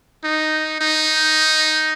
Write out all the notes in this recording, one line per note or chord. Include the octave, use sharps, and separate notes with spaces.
D#4
D#4